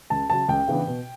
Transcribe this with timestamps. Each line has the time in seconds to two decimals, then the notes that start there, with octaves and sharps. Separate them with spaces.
0.10 C#2 A5
0.30 C#3 F#3 A5
0.48 C#2 G5
0.68 C#3 E3 B3 D4
0.88 B2